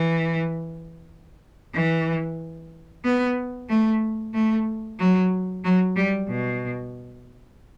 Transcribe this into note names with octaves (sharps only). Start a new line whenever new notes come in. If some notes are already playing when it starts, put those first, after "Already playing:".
Already playing: E3
E3
B3
A3
A3
F#3
F#3
G3
B2